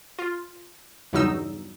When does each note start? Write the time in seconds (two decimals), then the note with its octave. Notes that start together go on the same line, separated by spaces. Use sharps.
0.19 F4
1.13 E2 G2 C#3 F#3 D#4 E6